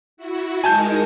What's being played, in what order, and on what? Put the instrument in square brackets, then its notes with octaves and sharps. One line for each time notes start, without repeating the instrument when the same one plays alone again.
[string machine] E4 F#4
[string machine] G#3 D#4 A#4 [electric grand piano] G#5 A5 G6